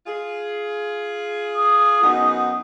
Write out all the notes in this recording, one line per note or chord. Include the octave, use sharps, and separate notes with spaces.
F4 G#4
D#6
F#2 B3 D#4